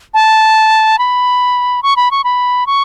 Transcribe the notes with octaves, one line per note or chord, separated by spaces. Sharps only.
A5
B5
C#6
B5
C#6
B5
C#6